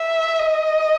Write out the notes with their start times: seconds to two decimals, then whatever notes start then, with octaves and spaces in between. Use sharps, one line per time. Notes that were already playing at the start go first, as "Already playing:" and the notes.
Already playing: E5
0.39 D#5